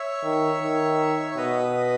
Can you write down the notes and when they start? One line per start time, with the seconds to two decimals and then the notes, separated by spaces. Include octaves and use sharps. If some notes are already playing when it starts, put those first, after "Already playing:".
Already playing: C#5 E5
0.23 D#3
0.61 D#3
1.31 C#5
1.37 B2 B4 D#5